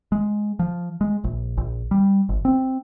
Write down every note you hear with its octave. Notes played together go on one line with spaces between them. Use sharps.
G#3
F3
G#3
A#1
A#1
G3
G#1
C4